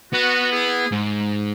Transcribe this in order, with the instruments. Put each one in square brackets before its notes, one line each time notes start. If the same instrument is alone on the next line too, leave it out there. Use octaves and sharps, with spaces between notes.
[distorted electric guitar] B3 [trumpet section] F#4
[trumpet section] E4 G#4
[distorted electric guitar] G#2